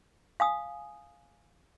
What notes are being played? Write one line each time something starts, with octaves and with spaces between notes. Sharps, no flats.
F5 G#5 D#6